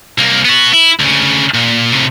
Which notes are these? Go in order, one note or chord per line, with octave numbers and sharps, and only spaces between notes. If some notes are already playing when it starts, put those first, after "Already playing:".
C2 A#3
B3 F#4
E4
D2 C#3
A#2
A2 C3